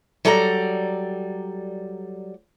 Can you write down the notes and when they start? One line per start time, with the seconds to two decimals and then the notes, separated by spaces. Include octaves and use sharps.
0.25 F#3 G3 A4 D5 A5 A#5